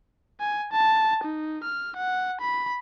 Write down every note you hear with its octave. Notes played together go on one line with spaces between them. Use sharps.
G#5
A5
D#4
F6
F#5
B5